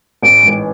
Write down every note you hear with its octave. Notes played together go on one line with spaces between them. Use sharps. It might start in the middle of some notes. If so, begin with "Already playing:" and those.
A1 D7
G#2 E3